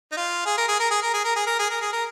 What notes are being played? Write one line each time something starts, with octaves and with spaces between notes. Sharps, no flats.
D#4
F4
G#4
A#4
G#4
A#4
G#4
A#4
G#4
A#4
G#4
A#4
G#4
A#4
G#4
A#4